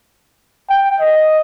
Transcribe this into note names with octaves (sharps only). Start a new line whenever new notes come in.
G5
D#5